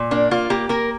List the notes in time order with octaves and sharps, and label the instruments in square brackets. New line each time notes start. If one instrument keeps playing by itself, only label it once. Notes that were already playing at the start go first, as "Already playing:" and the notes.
Already playing: [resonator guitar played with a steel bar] A#2
A#3 D4
A#3 F4
A#3 G4
A#3 A#4